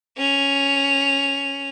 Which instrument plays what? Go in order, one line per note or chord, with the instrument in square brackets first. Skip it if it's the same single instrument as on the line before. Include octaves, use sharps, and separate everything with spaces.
[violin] C#4 F7